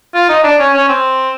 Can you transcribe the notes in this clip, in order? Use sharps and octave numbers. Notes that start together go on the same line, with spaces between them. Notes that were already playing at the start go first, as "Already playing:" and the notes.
F4
D#4
D4
C#4
C#4
C4